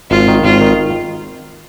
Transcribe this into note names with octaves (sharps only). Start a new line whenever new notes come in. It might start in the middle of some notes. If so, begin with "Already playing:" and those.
G#1 F4
D#3
G#1 F4
D#3